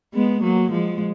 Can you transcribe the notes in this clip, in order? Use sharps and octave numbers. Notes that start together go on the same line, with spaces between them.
G#3 B3
F#3 A#3
F3 G#3